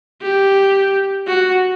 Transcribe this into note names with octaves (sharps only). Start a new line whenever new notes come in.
G4
F#4